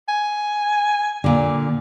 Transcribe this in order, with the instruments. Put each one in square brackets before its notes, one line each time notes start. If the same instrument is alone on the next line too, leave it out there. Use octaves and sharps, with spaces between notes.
[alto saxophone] G#5
[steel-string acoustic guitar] A#2 D3